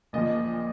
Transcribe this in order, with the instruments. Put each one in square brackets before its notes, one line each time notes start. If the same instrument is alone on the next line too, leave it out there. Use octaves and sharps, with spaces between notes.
[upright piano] A#1 A#2 F3 D#5